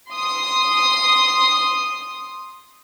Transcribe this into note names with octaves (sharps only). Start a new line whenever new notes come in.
C6 D#6